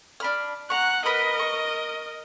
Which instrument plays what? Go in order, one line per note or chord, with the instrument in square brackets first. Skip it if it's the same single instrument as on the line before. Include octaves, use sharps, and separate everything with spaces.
[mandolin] D4 B5 F6
[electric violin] F#5 F#6 [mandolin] A#5 C#6
[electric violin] A#4 D#5 [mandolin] B4 B5 D#6
[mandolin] C#6